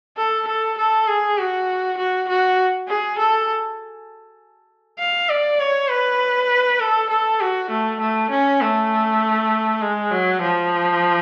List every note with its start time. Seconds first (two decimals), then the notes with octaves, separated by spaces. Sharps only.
0.17 A4
0.48 A4
0.78 A4
1.07 G#4
1.38 F#4
1.98 F#4
2.28 F#4
2.88 G#4
3.19 A4
4.99 F5
5.29 D5
5.59 C#5
5.90 B4
6.80 A4
7.10 A4
7.40 F#4
7.70 A3
8.00 A3
8.31 C#4
8.61 A3
9.82 G#3
10.11 F#3
10.41 F3